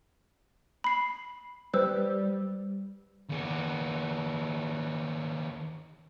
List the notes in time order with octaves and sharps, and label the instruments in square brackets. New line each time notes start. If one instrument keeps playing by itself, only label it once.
[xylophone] B5 C7
[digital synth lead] G3 [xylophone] B4 C5 E6
[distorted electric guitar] D#2 B3